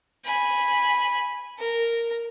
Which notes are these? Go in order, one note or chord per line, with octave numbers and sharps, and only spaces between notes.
G#5 B5
A#4